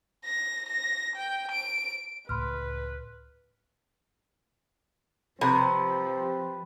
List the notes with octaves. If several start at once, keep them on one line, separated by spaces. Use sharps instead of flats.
A#6
A#6
G5
D7
C#2 A2 B4 B5 C6 F6
C3 F3 C4 B4